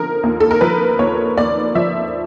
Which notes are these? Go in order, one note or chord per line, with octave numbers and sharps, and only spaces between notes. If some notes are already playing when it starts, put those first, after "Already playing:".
Already playing: D3 F3 A#4
D#2
A4
A#4
F3 B4
D#2 C#5
D#2 D5
F3 E5